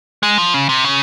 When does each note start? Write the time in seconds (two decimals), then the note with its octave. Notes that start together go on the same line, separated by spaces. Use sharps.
0.23 G#3
0.38 F3
0.54 C#3
0.69 C3
0.84 C#3